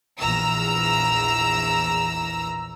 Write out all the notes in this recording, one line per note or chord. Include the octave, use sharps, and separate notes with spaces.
A#1 E2 A#5 E6